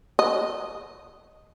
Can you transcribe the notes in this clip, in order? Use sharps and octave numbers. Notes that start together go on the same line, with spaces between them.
D#5